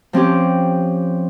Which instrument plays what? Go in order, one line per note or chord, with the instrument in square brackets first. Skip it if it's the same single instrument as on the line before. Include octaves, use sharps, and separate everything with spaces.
[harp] F3 C4 C#4 G4